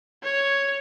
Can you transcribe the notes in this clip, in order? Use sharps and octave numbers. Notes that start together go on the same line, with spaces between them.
C#5